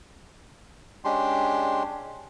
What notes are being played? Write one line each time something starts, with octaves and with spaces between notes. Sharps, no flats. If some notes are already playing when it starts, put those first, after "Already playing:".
G#3 C#4 D4 G4 C6